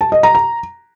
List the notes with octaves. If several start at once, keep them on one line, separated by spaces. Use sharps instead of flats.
A5
D#5
A#5
A#5